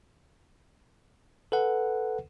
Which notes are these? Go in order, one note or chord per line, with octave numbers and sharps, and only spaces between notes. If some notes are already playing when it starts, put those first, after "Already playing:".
A4 B4 F#5